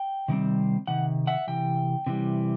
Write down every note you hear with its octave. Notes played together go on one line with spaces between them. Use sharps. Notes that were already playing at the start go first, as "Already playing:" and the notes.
Already playing: G5
C3 D#3 G3 C4
C3 D#3 F#5
E5 F#5
C3 E3 G5
C3 E3 G3